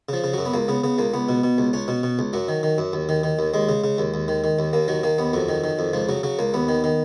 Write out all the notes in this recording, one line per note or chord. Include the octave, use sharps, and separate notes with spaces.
C#3 F3
C#3
F#2 F#3
B3
C#2 A#3
C#3 B3
C#3 B3
C#2 A#3
C#2 B3
B2
B2
C#2
C#2 C#4
B2
B2
C#2
F#2 F#3
D#3
D#3
F#2
D#2
D#3
D#3
D#2
D#2 G#3
C#3
C#3
D#2
D#2
D#3
D#3
D#2
D#2 A#3
D#3 F#3
D#3 A#3
D#2 B3
F2 F#3
D#3
D#3
F2
C#2 F3
C#3 F#3
C#3 F#3
C#2 A#3
D#2 B3
D#3
D#3